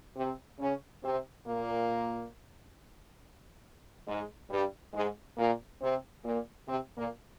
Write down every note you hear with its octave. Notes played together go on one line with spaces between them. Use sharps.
C3 C4
C#3 C#4
C3 C4
A#2 A#3
G#2 G#3
G2 G3
G#2 G#3
A#2 A#3
C3 C4
A#2 A#3
C3 C4
A#2 A#3